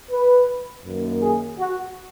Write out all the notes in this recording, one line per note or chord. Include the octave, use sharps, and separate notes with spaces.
B4
F#2 D#3 A#3
G#4
F#4